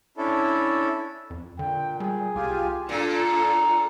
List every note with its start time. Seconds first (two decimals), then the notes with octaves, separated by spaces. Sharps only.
0.17 C#4 D4 E4 A4
1.30 F2
1.59 A#2 D3 G5
2.00 G3 G#4
2.35 C2 F4 G4 G#5
2.89 A#2 D4 F4 A4